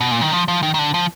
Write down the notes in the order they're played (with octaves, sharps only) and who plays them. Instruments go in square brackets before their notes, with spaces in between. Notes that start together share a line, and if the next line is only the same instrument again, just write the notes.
[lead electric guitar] B2
A#2
D#3
F3
F3
D#3
D#3
D3
F3